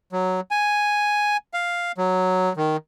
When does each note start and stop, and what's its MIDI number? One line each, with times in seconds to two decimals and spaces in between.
0.12 0.40 54
0.51 1.37 80
1.54 1.92 77
1.98 2.53 54
2.57 2.77 51